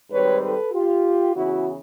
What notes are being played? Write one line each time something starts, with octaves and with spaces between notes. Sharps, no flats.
G#2 D#3 G3 C4 B4 C#5
A4 B4
F4 G4
E2 C#3 E3 E4 F#4